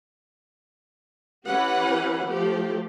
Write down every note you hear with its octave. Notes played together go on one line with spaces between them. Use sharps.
E3 C#4 G4 B4 F#5
F3 A3 G4